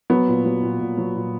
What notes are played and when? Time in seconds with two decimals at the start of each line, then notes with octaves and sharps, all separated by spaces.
0.10 F#3 B3
0.28 A#2
0.45 F#3
0.63 A#2
0.80 A#2
0.97 F#3
1.16 A#2